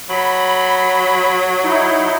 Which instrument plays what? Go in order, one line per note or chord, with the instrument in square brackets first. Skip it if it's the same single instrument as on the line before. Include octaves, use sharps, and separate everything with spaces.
[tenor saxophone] F#3 [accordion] B5
[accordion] D#4 E4